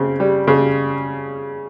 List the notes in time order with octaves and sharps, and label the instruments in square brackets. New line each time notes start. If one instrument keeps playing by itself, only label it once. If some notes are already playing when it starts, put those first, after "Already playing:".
Already playing: [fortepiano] C#3 C4
G3
C#3